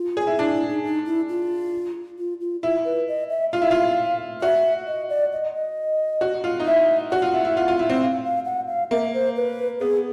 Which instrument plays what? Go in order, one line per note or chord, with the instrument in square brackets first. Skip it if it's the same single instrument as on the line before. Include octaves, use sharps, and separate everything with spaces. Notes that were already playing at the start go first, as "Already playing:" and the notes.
Already playing: [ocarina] F4
[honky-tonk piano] G#4
E4
[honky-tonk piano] D4 [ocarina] E4
[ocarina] E4
D#4
D#4
E4
F4
F4
F4
[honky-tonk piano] E4 [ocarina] F4
[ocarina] B4
D#5
E5
[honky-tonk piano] F4 [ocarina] F5
[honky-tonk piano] E4
F4
[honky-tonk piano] F#4 [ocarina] E5
[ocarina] D#5
D5
D#5
D#5
[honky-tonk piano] F#4
F4
D#4
[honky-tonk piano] E4 [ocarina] E5
[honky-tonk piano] F#4 [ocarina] F#5
[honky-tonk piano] F4
E4
E4
F4
F4
E4
C4
[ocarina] F5
F5
F#5
F5
[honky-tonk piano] A#3 [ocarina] E5
[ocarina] C5
B4
[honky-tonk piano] B3 [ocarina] G#4